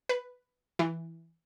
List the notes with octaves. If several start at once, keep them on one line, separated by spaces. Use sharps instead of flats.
B4
E3